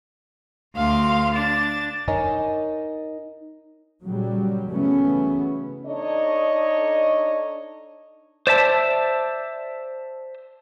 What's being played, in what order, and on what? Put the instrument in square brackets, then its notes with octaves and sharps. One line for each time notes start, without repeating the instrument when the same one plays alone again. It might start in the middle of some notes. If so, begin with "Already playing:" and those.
[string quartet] D2 F5 C6
D4 A6
[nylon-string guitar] D#4 A#4 C#5 D#5 G#5
[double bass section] A#2 C#3 F#3 G3
C#3 E3 F#3 A3 B3 C#4
[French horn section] D4 D#4 A4 C#5 D#5
[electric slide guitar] C5 D5 E5 A5